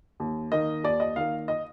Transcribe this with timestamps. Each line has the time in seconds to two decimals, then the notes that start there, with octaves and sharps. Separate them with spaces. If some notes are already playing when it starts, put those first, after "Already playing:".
0.20 D#2
0.52 D#3 A#3 D#5
0.84 D#2 D5
1.00 D#5
1.16 D#3 A#3 F5
1.48 D#5